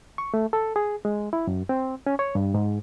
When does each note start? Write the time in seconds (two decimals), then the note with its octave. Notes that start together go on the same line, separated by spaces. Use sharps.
0.18 C#6
0.34 A3
0.53 A4
0.76 G#4
1.05 G#3
1.33 E4
1.47 F#2
1.69 C4
2.07 C#4
2.19 C#5
2.35 G2
2.54 G#2